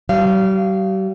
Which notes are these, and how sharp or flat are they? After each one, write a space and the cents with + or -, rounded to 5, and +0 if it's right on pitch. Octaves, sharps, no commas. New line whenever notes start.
G3 -40 F5 -25